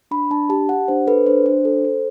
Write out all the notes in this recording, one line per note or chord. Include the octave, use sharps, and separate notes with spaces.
D4 B5
D4 A5
G4 A5
G4 F#5
D4 C5
A4 B4
D4 C5
D4 C5
A4
A4